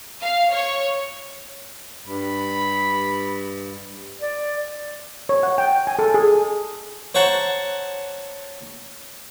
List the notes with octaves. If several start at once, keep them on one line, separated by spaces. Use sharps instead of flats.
F5
C#5
G2 B5
D5
C#5
F#5
G5
G#5
A4
G#4
C5 C#5 F#5 A5 A#5